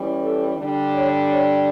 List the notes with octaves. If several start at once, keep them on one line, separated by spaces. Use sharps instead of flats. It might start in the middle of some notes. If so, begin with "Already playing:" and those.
Already playing: E3 G3 C#4
A4
D3 G3 D4
C#5
C#5